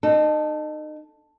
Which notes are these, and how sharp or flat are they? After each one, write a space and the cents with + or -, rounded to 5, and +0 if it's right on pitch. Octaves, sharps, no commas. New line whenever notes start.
D#4 -30 A4 +0